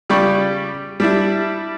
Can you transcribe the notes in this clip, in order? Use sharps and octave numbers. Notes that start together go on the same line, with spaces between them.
C#3 G3 D5 G5 B5 C#6
G3 D4 E4